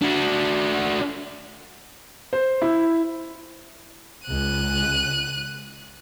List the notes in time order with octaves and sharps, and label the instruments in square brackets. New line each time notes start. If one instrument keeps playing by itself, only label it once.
[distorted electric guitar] D4 F#4
[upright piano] C5
E4
[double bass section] C#2 [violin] F#6 D#7